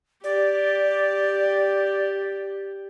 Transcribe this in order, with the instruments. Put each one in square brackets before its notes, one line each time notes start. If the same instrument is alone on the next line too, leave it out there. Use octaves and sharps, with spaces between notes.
[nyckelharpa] G4 [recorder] D5